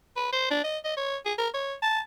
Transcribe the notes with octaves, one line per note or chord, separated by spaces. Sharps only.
B4
C5
D4
D#5
D#5
C#5
G#4
A#4
C#5
A5